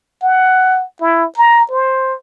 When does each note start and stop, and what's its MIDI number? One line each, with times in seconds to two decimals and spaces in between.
0.23 0.85 78
1.01 1.25 64
1.37 1.64 82
1.71 2.14 72